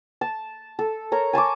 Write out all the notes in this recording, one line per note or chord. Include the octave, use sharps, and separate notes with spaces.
A5
A4
A#4 C#5 A#5
G#5 A5 C#6 D6